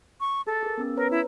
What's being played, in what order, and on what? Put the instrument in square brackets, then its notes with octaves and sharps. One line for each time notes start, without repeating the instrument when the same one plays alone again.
[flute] C#6
[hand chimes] G#4 A6 [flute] A4
[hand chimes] G#4 A#4
B3 C#4 E6
[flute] A#4 [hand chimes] B4 C#5 A#5
[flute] E4